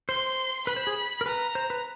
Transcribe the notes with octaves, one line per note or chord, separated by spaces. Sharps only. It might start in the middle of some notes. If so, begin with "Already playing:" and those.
C5 C6
B4 B5
C5
G#4
A#4
B4 A#5
C5
B4